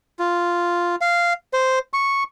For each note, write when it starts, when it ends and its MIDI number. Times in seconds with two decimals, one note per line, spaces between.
0.19 0.96 65
1.01 1.33 77
1.53 1.79 72
1.93 2.23 85